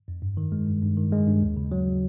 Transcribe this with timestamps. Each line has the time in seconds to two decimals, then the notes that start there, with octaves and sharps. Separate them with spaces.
0.08 F2
0.22 G2
0.37 D#3
0.52 G#3
0.67 G2
0.82 G2
0.97 D#3
1.12 G#3
1.28 G2
1.42 D#2
1.57 C#3
1.72 F#3